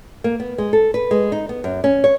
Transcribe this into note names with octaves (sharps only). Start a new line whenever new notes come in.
A#3
B3
G#3
A4
B4
G#3
D#4
B3
F#2
C#4
C#5